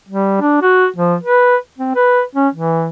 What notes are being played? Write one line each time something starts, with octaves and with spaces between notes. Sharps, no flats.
G3
D4
F#4
F3
B4
C4
B4
C#4
E3